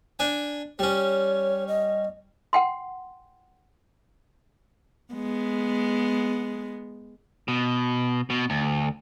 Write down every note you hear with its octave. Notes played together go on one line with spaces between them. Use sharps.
D4 G#5
G3 C#4 C#5
D#5
F#5 G5 C6
G#3 B3
B2
B2
D2